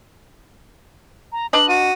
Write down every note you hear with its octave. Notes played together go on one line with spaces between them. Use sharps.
A#5
D4 B4 D#5 F#7
F#4 D#7